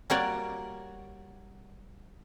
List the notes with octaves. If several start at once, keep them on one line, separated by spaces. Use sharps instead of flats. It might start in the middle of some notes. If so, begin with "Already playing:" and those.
G3 A#3 F#4 A#4 C#5 D5